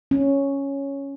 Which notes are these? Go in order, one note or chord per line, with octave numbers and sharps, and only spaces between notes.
C#4